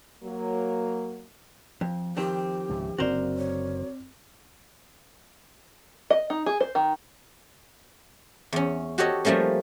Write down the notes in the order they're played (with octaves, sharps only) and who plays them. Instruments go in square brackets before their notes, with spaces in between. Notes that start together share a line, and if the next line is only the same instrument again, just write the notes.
[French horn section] F#3 A#3
[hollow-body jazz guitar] F2 [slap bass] F3
[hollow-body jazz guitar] F2 D#3 C4 [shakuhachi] G4
[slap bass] C#2 G#2 C3
[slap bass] F#1 D3 [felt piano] C4 D5 [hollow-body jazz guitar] F#4 A#4 C5
[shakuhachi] C#5
[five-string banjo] D#5
D#4
G#4
C5
D#3
[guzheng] E2 C#4
F#4 G4 A4 C#5 D#5
F3 G3 A3 A#3 C#4